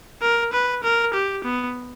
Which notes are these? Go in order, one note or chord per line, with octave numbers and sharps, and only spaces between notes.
A#4
B4
A#4
G4
B3